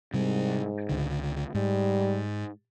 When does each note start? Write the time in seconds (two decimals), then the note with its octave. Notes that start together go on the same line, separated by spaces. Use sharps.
0.14 G#2 C3 G3
0.89 C#2 D3
1.55 G#2 G3